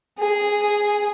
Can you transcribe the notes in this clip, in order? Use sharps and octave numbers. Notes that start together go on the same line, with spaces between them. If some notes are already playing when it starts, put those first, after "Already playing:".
G#4